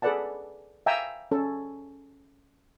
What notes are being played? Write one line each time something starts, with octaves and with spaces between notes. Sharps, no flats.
G#4 A4 B4 D5 F#5 A5
E5 F5 G5 G#5 A#5 E6
C#4 A4